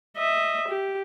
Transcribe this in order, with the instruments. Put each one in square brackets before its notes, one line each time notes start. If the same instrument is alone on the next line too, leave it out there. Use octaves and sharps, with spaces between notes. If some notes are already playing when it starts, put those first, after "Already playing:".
[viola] D#5 E5
G4